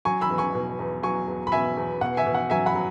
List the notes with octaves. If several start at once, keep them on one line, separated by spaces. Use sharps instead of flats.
F#3 G#5 C#6
B5 E6
E2
G#5 C#6
B2
E2
F#3 G#5 C#6
E2
B5
B2 E5 G#5
E2
B2 F#5
E5 G#5
B2
F#5
F#3 E5 G#5
F#5 B5
F#3